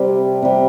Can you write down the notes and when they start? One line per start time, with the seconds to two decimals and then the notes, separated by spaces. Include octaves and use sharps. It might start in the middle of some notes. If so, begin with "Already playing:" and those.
Already playing: C3 G3
0.42 C3 G3